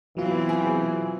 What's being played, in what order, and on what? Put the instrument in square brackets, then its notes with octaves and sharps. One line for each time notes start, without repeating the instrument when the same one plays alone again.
[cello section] B2 C4 [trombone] E3 [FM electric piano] F#3 F4
[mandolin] G#4 G5